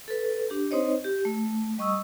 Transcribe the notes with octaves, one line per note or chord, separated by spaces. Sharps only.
A4 B4
D4 G4
C4 D#4 C5 C#5 D#5
G4
A3
G3 D#5 C#6 D#6 E6